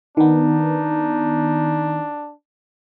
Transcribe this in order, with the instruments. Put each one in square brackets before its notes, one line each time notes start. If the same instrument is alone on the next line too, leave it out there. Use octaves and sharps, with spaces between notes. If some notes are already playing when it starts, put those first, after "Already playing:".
[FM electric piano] D#3 B3 [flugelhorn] D4 [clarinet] D#4